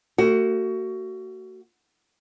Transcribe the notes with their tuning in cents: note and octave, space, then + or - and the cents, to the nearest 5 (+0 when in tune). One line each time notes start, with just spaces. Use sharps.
A3 +40 F#4 +20